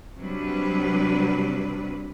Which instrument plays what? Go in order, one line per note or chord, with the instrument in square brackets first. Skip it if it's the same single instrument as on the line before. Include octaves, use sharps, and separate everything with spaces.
[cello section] C3 F#3 G3 D4 B4